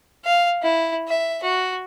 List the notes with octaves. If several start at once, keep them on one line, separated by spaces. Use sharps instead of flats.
F5
E4
E5
F#4